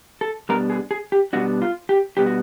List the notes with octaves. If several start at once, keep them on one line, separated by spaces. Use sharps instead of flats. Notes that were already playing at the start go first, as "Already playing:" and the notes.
A4
B2 G3 B3 D4 A#4
G#4
G#4
G4
B2 G3 B3 D4 F#4
F4
G4
B2 G3 B3 D4 G4
F#4